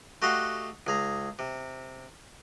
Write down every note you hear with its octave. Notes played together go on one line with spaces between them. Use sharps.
A3 F#4 G4 D#5 F5 F#5
C#2 G#4 A#5
C3